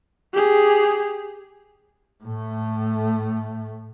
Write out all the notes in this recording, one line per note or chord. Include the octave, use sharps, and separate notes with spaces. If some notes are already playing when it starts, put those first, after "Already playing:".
G4 G#4
A2 A3